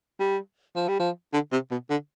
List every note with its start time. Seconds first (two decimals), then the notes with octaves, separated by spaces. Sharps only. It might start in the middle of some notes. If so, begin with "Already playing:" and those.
0.20 G3
0.76 F3
0.88 G3
1.00 F3
1.33 D3
1.52 C3
1.71 B2
1.90 D3